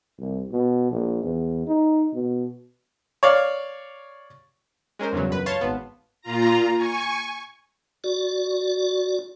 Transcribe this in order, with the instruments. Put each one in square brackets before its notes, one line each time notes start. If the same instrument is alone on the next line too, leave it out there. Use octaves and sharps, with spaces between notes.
[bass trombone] C2
B2
A#1
E2
D#4
B2
[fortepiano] C#5 D5 F5
[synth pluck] G#3 C#4 A#4 C5
E2 G2 C#3 F#3
C#2 F#2 B4
C#5 F5 A5 C6
G#1 B3
[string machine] A#2 F4 A#5
G#5 C#6
[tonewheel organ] F#4 D5